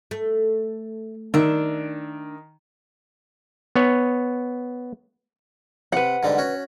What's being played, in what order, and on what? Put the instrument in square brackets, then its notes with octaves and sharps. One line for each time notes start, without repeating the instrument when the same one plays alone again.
[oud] A3
[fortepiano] D#3 [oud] D4 E5
[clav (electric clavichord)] B3 C#5
[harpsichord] C3 [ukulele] B4 F#5
[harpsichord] G#2 D3 G3
C#4 F#4